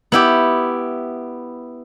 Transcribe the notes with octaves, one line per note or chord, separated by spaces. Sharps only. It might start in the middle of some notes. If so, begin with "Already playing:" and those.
B3 E4 G4